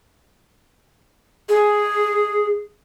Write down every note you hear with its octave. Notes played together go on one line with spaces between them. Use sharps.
G#4